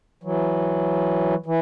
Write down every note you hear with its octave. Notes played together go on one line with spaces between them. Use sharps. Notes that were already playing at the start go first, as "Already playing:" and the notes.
E3 F#3
E3